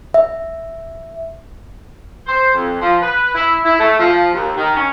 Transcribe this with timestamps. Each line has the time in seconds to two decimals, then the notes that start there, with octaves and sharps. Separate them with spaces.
0.14 E5
2.27 C5
2.54 F2
2.80 F3
3.01 B4
3.34 E4
3.64 E4
3.79 A3
3.99 F3
4.33 D#2
4.56 D#3
4.76 C#4